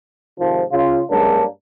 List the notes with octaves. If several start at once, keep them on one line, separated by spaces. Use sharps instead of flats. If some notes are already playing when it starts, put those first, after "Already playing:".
G#2 C3 D#3 F3
C#3 F4
G2 F#3 G#3 A#3 C#4 D4